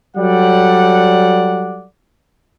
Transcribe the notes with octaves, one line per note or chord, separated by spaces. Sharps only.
F#3 G3 A4 D5 F#5